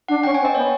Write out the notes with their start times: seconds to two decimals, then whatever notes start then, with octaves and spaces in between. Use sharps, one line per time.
0.08 D4 F#5
0.23 C#4 G5
0.34 G#5
0.40 C4
0.45 D#5
0.55 B3 C#5